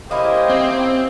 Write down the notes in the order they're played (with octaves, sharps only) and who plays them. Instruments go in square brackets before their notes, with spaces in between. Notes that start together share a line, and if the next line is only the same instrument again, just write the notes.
[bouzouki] A#3 C#4 E4 [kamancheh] G4 C5 [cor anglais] D#5
[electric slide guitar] C4